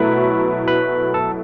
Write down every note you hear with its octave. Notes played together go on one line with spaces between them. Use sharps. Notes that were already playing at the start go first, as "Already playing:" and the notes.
Already playing: B2 F#3 A3 E4 B4 B5
B4 B5
A4 A5